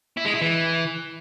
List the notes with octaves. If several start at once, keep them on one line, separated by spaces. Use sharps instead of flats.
E4
G#3
E4
E3